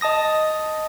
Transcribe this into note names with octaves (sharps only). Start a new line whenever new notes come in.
D#5 A5 D#6 A#6